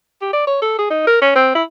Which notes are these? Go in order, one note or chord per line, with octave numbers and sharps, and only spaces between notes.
G4
D5
C#5
A4
G#4
D#4
A#4
C#4
C4
E4